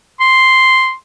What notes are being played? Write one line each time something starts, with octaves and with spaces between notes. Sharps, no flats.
C6